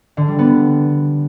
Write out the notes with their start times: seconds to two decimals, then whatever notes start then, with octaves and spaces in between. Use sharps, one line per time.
0.17 D3
0.28 G3
0.39 B3